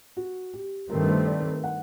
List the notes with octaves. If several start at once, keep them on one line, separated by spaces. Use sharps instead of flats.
F#4
G4
G2 D#3 A3 C4 A#4
C5
D5
F#5